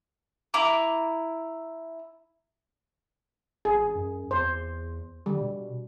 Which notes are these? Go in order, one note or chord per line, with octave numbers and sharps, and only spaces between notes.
E4 A#5 D6
A1 G#4
F#2
E2 C5
D3 G3
B2